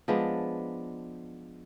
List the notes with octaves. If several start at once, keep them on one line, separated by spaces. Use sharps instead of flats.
F3 G#3 B3 D4